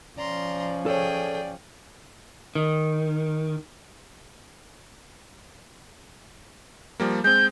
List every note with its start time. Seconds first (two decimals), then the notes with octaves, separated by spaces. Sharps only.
0.18 F3 C#4 D5 A#5 C6
0.86 G#4 A4 C#5 D5 G5
2.55 D#3
7.00 F3 G3 A#3
7.24 G#3 C4 G6